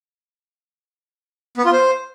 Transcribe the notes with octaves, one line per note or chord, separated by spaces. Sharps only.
B3
F4
C5